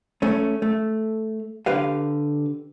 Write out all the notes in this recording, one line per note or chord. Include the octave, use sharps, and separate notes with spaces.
A3 C#4
A3
D3 G4 B4 F5